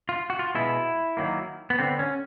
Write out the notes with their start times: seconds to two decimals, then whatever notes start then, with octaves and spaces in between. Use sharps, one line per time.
0.09 F4
0.30 F#4
0.39 F4
0.55 B2 G#3 B3 E4
1.17 D#3 F#3 A#3
1.70 B3
1.78 D3 F#3 C4
1.83 B3
1.99 C#4